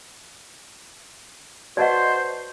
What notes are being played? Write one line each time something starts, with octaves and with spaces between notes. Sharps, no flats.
F#4 B4 C5 D5 D#5 F#5 A5